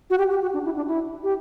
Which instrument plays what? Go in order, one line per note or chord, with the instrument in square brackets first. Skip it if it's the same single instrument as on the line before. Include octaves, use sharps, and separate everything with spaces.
[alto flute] F#4
G4
G4
F#4
D4
E4
D4
E4
G4